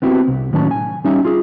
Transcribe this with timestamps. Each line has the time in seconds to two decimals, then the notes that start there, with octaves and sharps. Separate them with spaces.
0.02 B3 C4 E4 F#4 G4
0.27 C2
0.53 A2 D#3 F#3 C#4 A5
0.71 G#5
1.05 G3 C#4 D#4 E5
1.25 F4 G#4